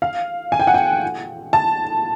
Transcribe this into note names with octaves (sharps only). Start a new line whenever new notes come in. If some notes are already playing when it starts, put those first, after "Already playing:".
F5
G#5
G5
F#5
G5
A5